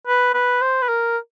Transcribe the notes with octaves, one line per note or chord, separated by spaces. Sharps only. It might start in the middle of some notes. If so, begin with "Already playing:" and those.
B4
B4
C5
B4
A#4